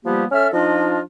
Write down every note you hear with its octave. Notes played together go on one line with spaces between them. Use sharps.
F3 G3 A#3 B3 G4
C#4 A4 E5 F6
F3 D4 D#4 F4 D#5